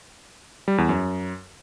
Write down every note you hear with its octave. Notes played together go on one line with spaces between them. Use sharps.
G3
E2
F#2